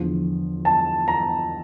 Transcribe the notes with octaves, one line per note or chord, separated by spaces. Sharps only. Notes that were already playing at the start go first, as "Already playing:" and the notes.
Already playing: E2 D3 F3
A5
A#5